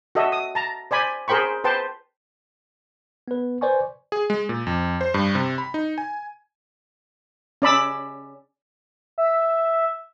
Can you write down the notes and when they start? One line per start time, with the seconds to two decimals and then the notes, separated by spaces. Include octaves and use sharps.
0.15 F#4 A4 D#5 E5
0.32 D#6
0.55 A5 A#5
0.91 C5 D5 G#5 B5
1.28 G#4 A#4 C5 G5 B5 C#6
1.64 B4 C5 G5 A5
3.28 B3 B4
3.61 B4 C5 D5 G#5 C#6
4.12 G#4
4.30 G#3
4.49 A#2
4.67 F2
5.01 C5
5.14 G2
5.35 C3
5.58 B5
5.74 D#4
5.98 G#5
7.62 C#4 D5 B5 E6
9.18 E5